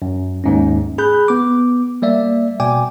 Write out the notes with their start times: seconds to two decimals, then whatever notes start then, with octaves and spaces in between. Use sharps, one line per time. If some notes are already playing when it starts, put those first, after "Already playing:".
0.02 F#2
0.44 D#2 G#2 C#4
0.98 G#4 B5 F#6 G6
1.28 B3 D6
2.02 G3 A#3 D5 E5
2.60 B2 D5 G5 G#5 D6